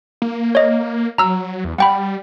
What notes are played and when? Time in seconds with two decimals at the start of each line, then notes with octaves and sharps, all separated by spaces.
0.22 A#3
0.55 C#5 D#5
1.18 F#3 A#5 E6 F6
1.64 E2
1.78 G3 F#5 G5 B5